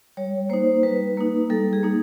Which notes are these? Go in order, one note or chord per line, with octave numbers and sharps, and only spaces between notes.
G3 C#5
A#3 D#4 C5
G3 B4
A#3 D#4
G3 A4
G#4
A#3 D#4